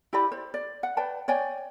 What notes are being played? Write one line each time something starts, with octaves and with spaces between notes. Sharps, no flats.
E4 G4 D5 B5
C5
D5
F#5
B4 D5 G5 A5
C#5 D5 G5 G#5